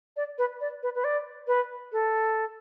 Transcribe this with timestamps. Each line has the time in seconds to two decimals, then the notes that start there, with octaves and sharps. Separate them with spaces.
0.17 D5
0.38 B4
0.61 D5
0.83 B4
0.95 B4
1.04 D5
1.47 B4
1.92 A4